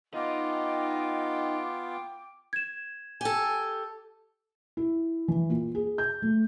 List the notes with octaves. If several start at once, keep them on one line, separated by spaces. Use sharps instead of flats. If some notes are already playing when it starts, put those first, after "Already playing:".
B3 D#4 F4 D#5 G5 D6
G#6 E7
G4 A4 G#5
E4
E3
A#2
G#4
G6
A3